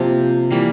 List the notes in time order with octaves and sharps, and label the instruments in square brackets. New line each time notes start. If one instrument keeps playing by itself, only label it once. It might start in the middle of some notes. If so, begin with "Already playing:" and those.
Already playing: [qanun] C3 F3 A#3
E3 G3 A#3